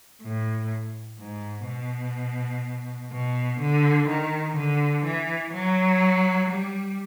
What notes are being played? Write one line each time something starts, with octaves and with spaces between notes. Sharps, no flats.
A2
G#2
B2
B2
D3
D#3
D3
E3
F#3
G3